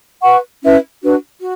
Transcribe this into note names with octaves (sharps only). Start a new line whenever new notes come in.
B4 F#5 C#6
C#4 E4 B4 E5
D4 F#4 B4
F#4